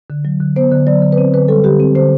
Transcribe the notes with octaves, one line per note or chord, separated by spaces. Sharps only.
D3
F#3
D3
B3 C5
D3
F#3 D5
D3
B4
C4 C5
D3 B4
G3 A4
D3 G4
C4
D3 C5